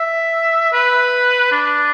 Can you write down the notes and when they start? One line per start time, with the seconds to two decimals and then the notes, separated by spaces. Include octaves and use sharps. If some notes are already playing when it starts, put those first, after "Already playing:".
Already playing: E5
0.72 B4
1.52 D4